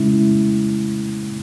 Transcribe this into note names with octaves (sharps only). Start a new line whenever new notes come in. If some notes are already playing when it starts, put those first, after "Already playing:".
Already playing: C#3 G#3 C#4 E4